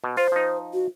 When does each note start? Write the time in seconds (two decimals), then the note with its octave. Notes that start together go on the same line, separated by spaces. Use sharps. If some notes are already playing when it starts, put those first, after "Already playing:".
0.04 B2
0.17 F4 C5
0.32 F3 D#4
0.73 F#4